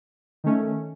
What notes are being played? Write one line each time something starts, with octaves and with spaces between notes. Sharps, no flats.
D#3 A3 C#4